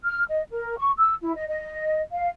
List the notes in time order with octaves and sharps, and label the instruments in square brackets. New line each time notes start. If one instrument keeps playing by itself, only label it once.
[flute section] F6
D#5
A#4
C#6
E6
E4
D#5
D#5
F5